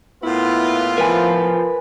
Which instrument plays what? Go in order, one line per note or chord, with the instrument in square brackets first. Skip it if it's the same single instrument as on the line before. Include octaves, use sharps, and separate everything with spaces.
[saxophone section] A2 A#3 E4 [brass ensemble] B3 F4
[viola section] F3 [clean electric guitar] A#4 B4 G#5